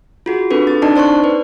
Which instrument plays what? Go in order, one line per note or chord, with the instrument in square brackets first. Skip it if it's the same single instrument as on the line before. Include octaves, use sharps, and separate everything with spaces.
[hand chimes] F4 F#4 G#4
C4 D4 A4 B4
A6
C4 D4 D#4 D5 D#5 A5
C5 D5 C6 C#6 F#6
B4